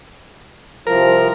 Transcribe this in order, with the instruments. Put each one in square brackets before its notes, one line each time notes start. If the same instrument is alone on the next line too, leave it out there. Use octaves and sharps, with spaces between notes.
[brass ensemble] C2 C3 F3 [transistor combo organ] A#4